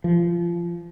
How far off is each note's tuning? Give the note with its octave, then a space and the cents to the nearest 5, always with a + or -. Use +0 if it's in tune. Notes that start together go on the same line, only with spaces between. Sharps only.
F3 -25